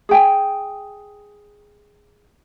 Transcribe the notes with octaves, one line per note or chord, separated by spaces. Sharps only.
G#4 G5 G#5